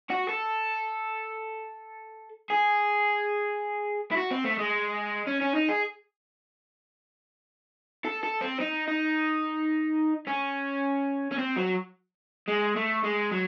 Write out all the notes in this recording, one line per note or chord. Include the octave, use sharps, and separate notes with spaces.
F#4
A4
G#4
E4
F#4
C4
A3
G#3
C#4
C#4
D#4
G#4
A4
A4
C4
D#4
D#4
C#4
C#4
C4
F#3
G#3
A3
G#3
F#3